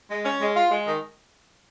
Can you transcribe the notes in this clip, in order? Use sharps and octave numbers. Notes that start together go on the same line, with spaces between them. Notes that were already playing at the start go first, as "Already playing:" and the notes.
G#3
C#4
G#3
F4
G#3
D#3